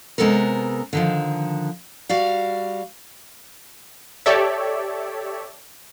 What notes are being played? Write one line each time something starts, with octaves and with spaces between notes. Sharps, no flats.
C3 G#3 B3 A4 A#4
D3 D#3 F3
G3 F#4 D5 F5
G4 A4 C#5 D5 E5